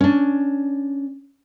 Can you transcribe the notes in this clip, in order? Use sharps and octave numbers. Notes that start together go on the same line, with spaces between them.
C#4 D4